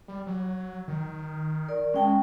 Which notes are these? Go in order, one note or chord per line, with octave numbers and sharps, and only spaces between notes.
G3
F#3
D#3
A#4 D5
G#3 C#4 G5 A5